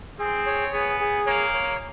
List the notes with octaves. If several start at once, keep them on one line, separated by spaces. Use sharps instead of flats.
C4 G#4
C#5
B3 G#4
G#4
A#3 C#5
C#5